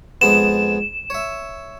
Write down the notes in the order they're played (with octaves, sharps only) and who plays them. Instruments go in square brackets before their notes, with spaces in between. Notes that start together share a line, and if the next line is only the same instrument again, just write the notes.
[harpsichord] F2 G#3 B3 [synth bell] E7
[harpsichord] C#5 E5